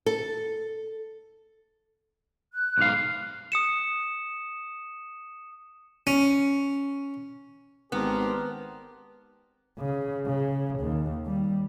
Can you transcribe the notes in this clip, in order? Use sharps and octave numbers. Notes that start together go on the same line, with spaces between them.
A4
F#6
B1 G#2 F5
D#6 C#7 E7
C#4
G#1 B3 D4 G4 A#4 C5
C#3
C#3
D#2
G3